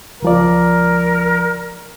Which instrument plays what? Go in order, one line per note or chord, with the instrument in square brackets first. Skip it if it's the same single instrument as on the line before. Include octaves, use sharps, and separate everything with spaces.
[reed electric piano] C#2 F3 D5 [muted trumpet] A#4